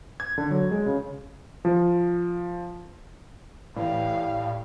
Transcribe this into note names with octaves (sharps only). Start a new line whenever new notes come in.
G#6
D3
F#3
G#3
C#3
F3
A2 E3 G3 F5